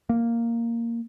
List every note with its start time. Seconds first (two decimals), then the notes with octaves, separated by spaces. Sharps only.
0.09 A#3